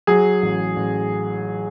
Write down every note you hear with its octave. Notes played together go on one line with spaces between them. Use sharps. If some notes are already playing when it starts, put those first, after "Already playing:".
F#3 G#4
A1
A1